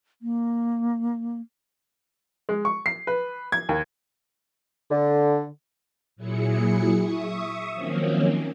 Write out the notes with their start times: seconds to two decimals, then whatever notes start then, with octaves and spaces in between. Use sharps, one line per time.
0.22 A#3
2.49 G#3
2.65 C#6
2.86 C7
3.07 B4
3.52 G#6
3.69 D#2
4.91 D3
6.16 A#2 F#3 E4 G#4 C#7
6.99 E5 C#6 D#6
7.72 D#3 F3 F#3 A#3 C4 C#4